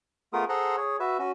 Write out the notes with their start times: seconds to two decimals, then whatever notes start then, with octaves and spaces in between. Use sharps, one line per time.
0.33 A3 B3 F4 G#4 A#4 D#6
0.49 G#4 A4 C5 F#5 A#5 C6
0.77 G#4 C#5
1.00 F#4 B4 E5
1.19 C#4 F#4